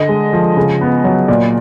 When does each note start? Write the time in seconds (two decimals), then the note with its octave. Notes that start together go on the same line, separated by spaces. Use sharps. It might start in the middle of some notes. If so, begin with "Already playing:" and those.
Already playing: D3 D#5
0.09 G#3
0.33 F3
0.57 C#3
0.81 B3
1.04 F#3
1.28 A#2 D5